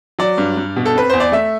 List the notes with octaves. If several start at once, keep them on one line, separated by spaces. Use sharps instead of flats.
F#3 D5
G2
G2
B2
A4
C4 B4
E2 C5
D5
A3 E5